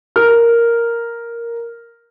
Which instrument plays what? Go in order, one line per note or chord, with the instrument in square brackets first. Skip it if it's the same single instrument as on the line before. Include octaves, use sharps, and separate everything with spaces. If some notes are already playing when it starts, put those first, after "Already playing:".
[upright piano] A#4 F6